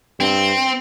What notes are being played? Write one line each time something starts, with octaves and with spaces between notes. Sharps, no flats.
G2 C4